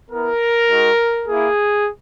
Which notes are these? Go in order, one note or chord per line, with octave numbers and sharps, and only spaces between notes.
B3 E4 A#4
G#3 D#4 F#4
A#3 E4 G#4